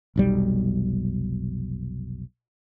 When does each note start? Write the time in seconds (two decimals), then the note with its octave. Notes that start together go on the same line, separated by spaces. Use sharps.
0.16 F1 B1 G3